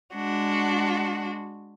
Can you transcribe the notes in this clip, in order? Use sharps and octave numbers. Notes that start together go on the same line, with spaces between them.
G#3 D4 F#4